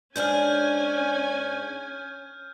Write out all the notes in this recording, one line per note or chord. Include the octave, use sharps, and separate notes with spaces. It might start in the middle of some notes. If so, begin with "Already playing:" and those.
G#2 C#4 D4 G#4 G#5 F6 G6